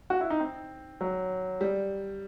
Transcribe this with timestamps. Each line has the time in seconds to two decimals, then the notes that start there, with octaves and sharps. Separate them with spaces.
0.10 F#4
0.21 E4
0.30 D#4
0.40 C4
1.01 F#3
1.61 G3